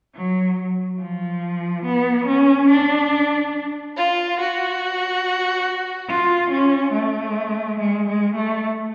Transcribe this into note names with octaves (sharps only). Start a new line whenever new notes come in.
F#3
F3
B3
C#4
D4
F4
F#4
F4
C#4
A3
G#3
G#3
A3